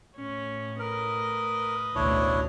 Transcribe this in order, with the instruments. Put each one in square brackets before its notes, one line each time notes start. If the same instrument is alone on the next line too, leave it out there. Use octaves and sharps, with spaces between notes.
[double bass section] A2 [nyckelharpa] C#4
[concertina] A#4 [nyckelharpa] B4 D#5
[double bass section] A1 D2 B2 [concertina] D4 E4 C#5